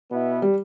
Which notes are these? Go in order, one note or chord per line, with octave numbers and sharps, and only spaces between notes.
B2 B3 E4
G3